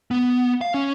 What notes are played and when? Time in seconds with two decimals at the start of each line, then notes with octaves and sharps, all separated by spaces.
0.11 B3
0.61 F5
0.74 C#4